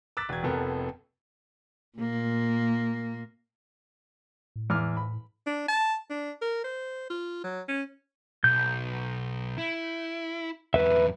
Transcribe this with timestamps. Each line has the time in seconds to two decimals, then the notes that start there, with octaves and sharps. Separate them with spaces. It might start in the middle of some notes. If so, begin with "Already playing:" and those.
0.17 D6 E6 F#6 A6 B6
0.29 E1 G#6
0.43 F1 F2 B3 A4 A#4
1.98 A#2 A#3
4.56 A2
4.70 E2 D6 F6
4.97 B5
5.46 D4
5.68 A5
6.10 D4
6.41 A#4
6.64 C5
7.10 F4
7.44 F#3
7.68 C#4
8.44 B1 G6
9.58 E4
10.74 E2 F#3 B4 E5